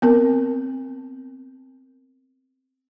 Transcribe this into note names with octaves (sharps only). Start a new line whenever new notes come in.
B3 C4 A#4